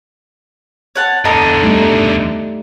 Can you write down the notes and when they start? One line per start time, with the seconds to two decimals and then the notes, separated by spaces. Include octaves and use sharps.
0.95 C#5 F#5 A5
1.25 E2 D3 A4 D#5 A#5
1.63 G3 A3 D#4